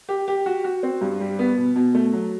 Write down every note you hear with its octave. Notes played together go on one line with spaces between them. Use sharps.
G4
G4
F#4
F#4
C4
G2
G3
B3
B2
B2
A3
F#3